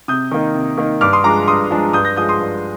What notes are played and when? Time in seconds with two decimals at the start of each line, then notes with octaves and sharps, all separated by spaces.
0.08 C3 D#6 G6
0.32 D#3 A#3 D#4
0.55 C3
0.78 D#3 A#3 D#4
1.01 G2 D6 F6
1.13 C6 D#6
1.24 F3 G#3 D4 A#5 D6
1.47 G2 C6 D#6
1.71 F3 G#3 D4
1.93 G2 D#6 G6
2.05 G6 A#6
2.16 F3 G#3 D#6 G6
2.29 C6 D#6
2.39 G2